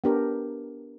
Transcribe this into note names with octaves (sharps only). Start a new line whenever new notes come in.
B3 D4 G4 A#4